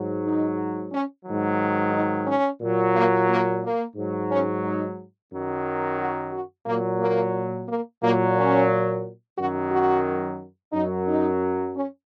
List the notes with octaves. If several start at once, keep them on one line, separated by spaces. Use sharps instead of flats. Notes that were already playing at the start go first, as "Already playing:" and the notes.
Already playing: G#2 F#3
D#4
C#4
G#2 D#3 F#3
D#4
C#4
A#2 F#3
A#3
A#3
A#3
G#2 F#3
C#4
D#4
F#2 D#3 F#3
F#4
F#4
A#2 F#3 A#3
A#3
A#3
A#2 F#3 A#3
C#4
F#2 D#3 F#3 F#4
F#4
F#2 F#3 D#4
D#4
C#4